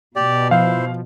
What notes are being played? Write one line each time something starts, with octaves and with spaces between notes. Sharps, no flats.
B2 G4 D5
F3 E4 C5 F5